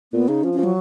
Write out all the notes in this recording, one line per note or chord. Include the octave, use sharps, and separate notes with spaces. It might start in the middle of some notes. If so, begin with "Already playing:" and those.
A#2 B3
C#3 D#4
F3 C#4
F3 C#4
F#3